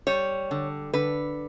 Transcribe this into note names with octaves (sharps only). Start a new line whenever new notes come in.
G3 C#5
D3
D3 B4